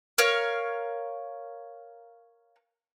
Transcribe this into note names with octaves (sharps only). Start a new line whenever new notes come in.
A#4 C#5 F5